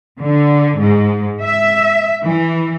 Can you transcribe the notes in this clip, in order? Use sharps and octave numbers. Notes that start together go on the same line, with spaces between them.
D3
G#2
E5
E3